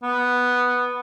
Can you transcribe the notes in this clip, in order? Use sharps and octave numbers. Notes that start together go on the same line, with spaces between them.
B3